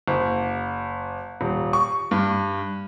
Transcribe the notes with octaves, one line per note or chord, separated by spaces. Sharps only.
F#1
D#1
C#6
G2